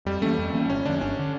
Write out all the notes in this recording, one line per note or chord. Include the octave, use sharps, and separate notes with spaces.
F2 G3
E3 A3 A#3 C#4
F2
E3 A#3 C#4
G1 C#4
F2 D3 D4
G1 C#4
D3